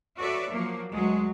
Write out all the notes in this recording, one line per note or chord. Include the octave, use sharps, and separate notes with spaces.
F#4 A4 B4 C#5 D5 E5
F3 F#3 A#3
D2 F#3 G#3